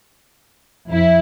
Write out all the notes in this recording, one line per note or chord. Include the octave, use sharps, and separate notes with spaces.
F2 E4